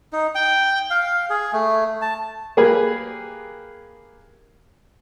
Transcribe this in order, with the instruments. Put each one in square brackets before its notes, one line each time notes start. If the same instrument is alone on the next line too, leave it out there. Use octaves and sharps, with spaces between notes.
[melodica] D#4
G5
F5
G#4
A3
A5
[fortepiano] A#3 G4 G#4 B4